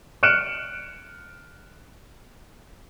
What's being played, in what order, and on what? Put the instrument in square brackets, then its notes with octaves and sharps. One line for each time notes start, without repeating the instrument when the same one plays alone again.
[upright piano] F6 F#6 C#7 D7 E7